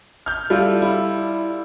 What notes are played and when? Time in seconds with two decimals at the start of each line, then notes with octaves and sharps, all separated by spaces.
0.26 F6 G6
0.50 G3 E4 F4 A4
0.82 E4